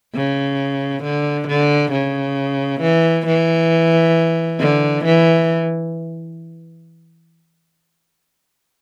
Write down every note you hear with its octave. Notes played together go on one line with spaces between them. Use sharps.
C#3
D3
D3
C#3
E3
E3
D3
E3